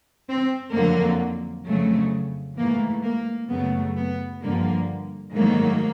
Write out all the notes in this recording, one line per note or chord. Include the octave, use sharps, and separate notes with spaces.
C4
F2 D3 F#3 A#3
F2 C#3 F#3 A3
G#2 E3 A3 A#3
A#3
F#2 C#3 F#3 A3 B3
B3
G2 D3 F3 A#3
G#2 D#3 F#3 A3 A#3